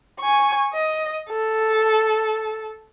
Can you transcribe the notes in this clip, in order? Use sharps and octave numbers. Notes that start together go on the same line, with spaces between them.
G#5 C#6
D#5
A4